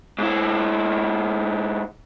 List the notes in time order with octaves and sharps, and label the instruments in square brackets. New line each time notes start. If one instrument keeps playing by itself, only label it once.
[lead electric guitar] G#2 E4